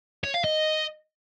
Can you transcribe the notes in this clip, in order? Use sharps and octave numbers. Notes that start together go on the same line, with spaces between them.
C#5
F5
D#5